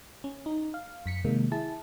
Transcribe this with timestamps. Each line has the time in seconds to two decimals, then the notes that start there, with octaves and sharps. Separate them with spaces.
0.24 C#4
0.46 D#4
0.74 F5
1.06 F#2 B6 C#7
1.24 C3 D#3 G#3 A#3
1.52 E4 G#4 A5